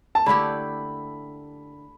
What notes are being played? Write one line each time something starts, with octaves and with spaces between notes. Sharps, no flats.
A5
D3 A3 E4 G4 B5